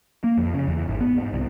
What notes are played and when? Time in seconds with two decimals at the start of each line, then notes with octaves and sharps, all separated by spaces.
0.24 A#3
0.37 F2
0.54 C#3
0.68 E2
0.88 G#1
1.01 B3
1.17 G#2
1.33 C2